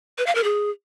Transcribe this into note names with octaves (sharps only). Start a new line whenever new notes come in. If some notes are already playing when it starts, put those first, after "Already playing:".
B4
F5
A#4
G#4